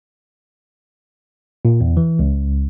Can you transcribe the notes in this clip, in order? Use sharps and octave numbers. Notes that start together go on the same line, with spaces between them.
A#2
E2
E3
C#2